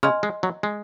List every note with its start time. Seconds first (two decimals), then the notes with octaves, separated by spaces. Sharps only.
0.03 C#3 D#5 G#5 C6 F6
0.23 G#3
0.43 F#3
0.63 G#3